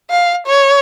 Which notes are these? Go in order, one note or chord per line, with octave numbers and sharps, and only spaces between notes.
F5
C#5